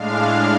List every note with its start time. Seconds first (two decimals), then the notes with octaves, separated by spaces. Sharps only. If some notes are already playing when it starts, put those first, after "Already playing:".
Already playing: A2 G#3 D4 F5